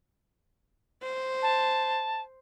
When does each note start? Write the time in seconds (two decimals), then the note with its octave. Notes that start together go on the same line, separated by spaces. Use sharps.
1.03 C5
1.42 A5